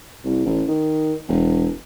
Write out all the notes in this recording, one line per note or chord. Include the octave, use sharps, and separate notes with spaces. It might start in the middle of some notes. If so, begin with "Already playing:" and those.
C2
A1
D#3
E1